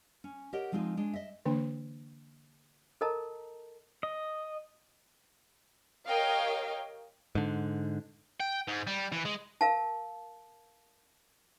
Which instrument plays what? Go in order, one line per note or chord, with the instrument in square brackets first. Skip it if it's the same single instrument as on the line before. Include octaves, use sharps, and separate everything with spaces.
[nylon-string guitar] C#4
G4 A#4 C#5 D#5 F#5
F3 G#3 C4 D#4 F4
G#3 D4
D#5 E5
[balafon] D3 E3 A#3 D4
[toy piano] A4 A#4 D#5 A5 A#5
[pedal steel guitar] D#5
[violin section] G4 A#4 C#5 D#5 F5 G5
[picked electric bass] G#2 D3
[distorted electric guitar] G5
G#2
G3
E3
G#3
[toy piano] A#4 F5 A5